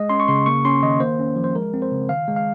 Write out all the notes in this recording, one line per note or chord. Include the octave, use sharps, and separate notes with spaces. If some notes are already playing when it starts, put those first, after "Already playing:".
Already playing: G#3 D#5
C#4 C6
C#6
C#3 C6
A#3 C#6
C#4 C6
D#3 D#5
A#3 C5
C#4
F3
C5
G#3 A#4
C4
C5
C#3
D#3 F5
G#3
F5